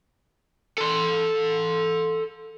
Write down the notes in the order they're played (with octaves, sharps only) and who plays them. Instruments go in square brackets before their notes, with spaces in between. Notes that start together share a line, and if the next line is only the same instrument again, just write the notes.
[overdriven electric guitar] A4 C6